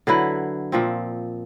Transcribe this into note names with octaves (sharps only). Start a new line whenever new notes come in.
D3 F#3 E4 B4
A#2 F3 C4